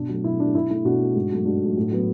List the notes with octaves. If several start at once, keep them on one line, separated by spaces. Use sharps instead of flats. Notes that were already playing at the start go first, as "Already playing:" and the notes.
Already playing: B2 D4
F#3 A3
B2 E4
F#3 A3 D4
B2 E4
A3 E4
B2 D4 F#4
A3
G#2
F#3 A3
G#2 D4 F#4
F#3 A3
A2
F#3 B3